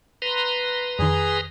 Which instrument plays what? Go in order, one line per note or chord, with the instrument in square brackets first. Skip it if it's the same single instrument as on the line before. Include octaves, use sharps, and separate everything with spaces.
[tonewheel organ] B4 A#5 C6
[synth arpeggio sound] F2 D#3 [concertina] G#4